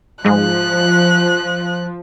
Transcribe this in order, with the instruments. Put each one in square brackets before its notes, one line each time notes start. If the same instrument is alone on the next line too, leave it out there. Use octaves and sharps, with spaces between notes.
[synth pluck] G#2 G#3 [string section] F3 [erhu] F#6